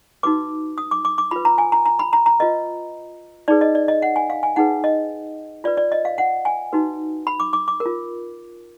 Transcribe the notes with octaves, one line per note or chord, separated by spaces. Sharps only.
D#4 F#4 B4 D6
D#6
D6
D6
D6
F4 B4 B5
A#5
G#5
A#5
A#5
B5
A#5
A#5
F4 B4 D#5
D#4 G#4 B4 D5
D#5
D5
D#5
F#5
G#5
F5
G#5
D#4 G#4 B4 F#5
D#5
F4 B4 D5
D5
D#5
F5
F#5
G#5
D#4 F#4 B4
B5
D6
D6
D6
A#4
F4